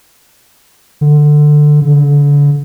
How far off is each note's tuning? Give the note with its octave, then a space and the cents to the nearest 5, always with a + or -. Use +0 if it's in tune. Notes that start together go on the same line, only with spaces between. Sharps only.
D3 +15
D3 -35